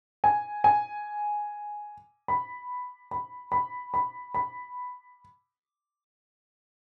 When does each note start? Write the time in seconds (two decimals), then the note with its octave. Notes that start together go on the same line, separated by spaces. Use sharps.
0.24 G#5
0.64 G#5
2.28 B5
3.11 B5
3.52 B5
3.94 B5
4.34 B5